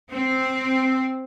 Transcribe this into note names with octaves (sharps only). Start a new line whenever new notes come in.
C4